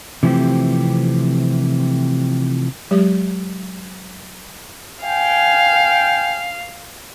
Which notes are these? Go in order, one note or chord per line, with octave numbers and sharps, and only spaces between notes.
C3 E3 F3 A3 C4 G4
F#3 G#3 G4
F5 G5 G#5